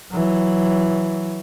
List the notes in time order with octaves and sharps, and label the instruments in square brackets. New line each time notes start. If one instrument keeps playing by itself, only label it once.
[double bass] E3 F#3